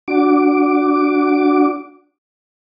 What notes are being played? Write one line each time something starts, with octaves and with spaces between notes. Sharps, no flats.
D4 F#4 D6